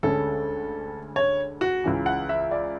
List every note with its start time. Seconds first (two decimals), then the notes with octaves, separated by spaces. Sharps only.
0.03 D2 D3 G#3 C#4 A4
1.16 C#5
1.61 F#4
1.84 C#2 C#3 E3
2.06 F#5
2.29 E5
2.51 D5